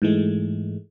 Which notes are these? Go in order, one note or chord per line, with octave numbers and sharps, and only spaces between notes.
G#2 E3 G#3 A3